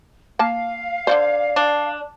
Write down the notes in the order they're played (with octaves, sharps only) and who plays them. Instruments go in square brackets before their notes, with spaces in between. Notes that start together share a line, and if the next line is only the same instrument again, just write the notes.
[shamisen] A#3 A5 [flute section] F5
[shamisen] D3 D#3 C5 [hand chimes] D5
[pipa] D4